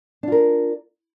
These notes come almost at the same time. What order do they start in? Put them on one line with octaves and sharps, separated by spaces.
D4 F4 A#4